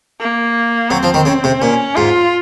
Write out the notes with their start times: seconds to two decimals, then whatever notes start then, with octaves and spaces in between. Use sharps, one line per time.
0.20 A#3
0.90 F#3 C4
1.03 F3
1.14 D#3
1.25 C#3
1.44 C3
1.61 A#2 C#4
1.96 G#2 F4